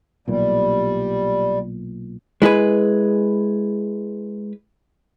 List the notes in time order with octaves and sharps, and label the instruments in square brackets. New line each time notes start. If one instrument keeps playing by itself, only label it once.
[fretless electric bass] B1 A#2 E3 [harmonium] G3
[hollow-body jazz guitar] G#3 E4 G#4 B4